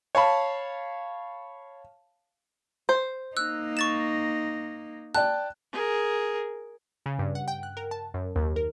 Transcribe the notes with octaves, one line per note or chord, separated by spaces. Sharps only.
C#5 F5 A5 B5
C5
A#3 D#4 E6 F#6
C#6 A6 E7
D5 G5 A5 F#6
G#4 A#4
C#3
G2
F#5
G5
F#6
A#4
A5
F#2
D#2
A#4